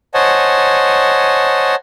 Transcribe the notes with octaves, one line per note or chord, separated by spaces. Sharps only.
C5 C#5 D#5 F#5 G#5 A5